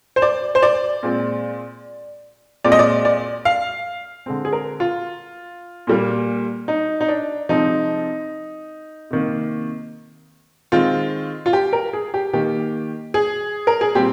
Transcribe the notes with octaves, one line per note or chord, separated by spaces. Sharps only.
C5
D5
C5
D5
A#2 G#3 C4
A#2 G#3 C4 D5
D#5
D5
D5
F5
D3 G#3 C4
G#4
A#4
F4
A#2 G3 A#3
D#4
D#4
D4
C3 F3 G#3 C4 D#4
C3 D#3 A#3
D#3 G#3 C4 F4
F4
G4
A#4
G#4
G4
D#3 A#3 G4
G#4
A#4
G#4
A#2 G3 C4 G4